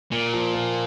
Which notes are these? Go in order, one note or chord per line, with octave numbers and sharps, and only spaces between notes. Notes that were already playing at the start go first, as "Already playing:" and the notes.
A#2 A#3
F3
A#3